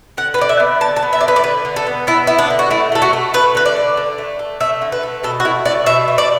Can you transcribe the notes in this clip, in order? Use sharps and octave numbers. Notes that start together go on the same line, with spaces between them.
D3 F#5
B4
D3 D5
E5
B3
D3 A5
A5
B3
E5
D3 D5
B4
D5
D3 B4
D3
A4
B3
B3 E4
B3 E4
D4
D3
F#4
A3 E4
A3 A4
F#4
A3
A3 B4
D3 B4
D5
A3
D3
A3
A3
A3 E5
D3
B4
A3
B2 A4
F#4
A3 E4
A3 D5
B2 E5
A3
D5